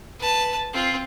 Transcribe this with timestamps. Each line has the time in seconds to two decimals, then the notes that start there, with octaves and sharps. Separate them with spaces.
0.19 B4 A5
0.73 C4 F4